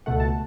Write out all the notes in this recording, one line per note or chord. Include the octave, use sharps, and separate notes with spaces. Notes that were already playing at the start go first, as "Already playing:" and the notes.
C#2 B2 A3 F#5
A5